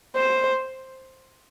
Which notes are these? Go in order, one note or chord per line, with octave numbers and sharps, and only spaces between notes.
C5